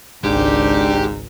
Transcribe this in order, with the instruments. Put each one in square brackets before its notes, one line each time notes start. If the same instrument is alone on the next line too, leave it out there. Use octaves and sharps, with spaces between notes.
[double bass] G#1 C#2 [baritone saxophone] G#2 [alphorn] D4 [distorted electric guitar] G4